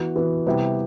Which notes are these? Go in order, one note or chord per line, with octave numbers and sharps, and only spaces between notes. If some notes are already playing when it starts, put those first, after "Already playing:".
Already playing: E3 B3 F#4
E3 B3 F#4
C3 G3 B3 E4 G4